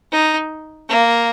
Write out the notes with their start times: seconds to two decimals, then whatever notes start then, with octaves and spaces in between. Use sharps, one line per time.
0.12 D#4
0.89 A#3